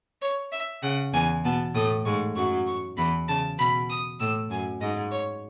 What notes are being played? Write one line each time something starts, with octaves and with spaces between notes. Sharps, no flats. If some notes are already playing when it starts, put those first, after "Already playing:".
C#5
E5
C#3 F#5
E2 E3 G#5
B2 B3 A5
A2 A3 D#6
G#2 G#3 C#6
F#2 F#3 C#6
C#6
E2 E3 B5
C#3 A5
B2 B5
D#6
A2 E6
F#2 G#5
G#2 D#5
C#5